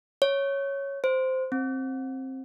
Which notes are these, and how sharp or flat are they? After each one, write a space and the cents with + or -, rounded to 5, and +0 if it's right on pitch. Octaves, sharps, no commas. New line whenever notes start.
C#5 -5
C5 -10
C4 +15